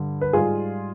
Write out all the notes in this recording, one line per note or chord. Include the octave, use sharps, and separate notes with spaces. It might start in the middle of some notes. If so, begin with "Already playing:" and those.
Already playing: G2 D3 G3
B4
G#2 G3 F4 G#4